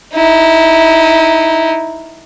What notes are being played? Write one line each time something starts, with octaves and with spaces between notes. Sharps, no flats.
D#4 E4